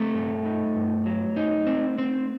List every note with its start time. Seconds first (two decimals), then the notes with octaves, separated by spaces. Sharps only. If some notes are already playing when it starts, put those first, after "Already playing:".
Already playing: A3 C4 A4
0.14 G2
0.45 D#4
0.76 G2
1.06 F#3
1.36 D#4
1.67 C4
1.98 C4